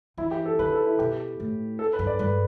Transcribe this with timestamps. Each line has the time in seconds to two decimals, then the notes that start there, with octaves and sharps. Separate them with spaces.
0.18 E3 E4
0.31 G4
0.46 A4
0.59 D3 B4
0.72 A4
0.86 E4
0.99 B2 G4
1.40 A2
1.79 A4
1.93 B4
1.99 G2
2.07 D5
2.19 G2 B4